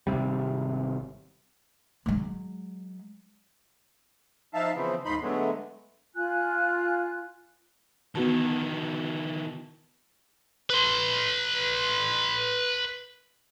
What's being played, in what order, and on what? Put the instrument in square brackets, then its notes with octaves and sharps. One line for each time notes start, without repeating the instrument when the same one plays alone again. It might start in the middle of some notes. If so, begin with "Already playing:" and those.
[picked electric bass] G#1 D#2 C3 G3
[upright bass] F#3 G#3
[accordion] F3 D#4 E5 F5 A5
C#3 E3 F3 B3 C4
D#2 G#2 D#4 B5 C6
D3 F#3 G#3 A3 B3
[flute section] F4 G#5 F#6
[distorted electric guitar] D#3 E3 [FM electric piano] B3 F#4 A5
[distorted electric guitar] B4 C6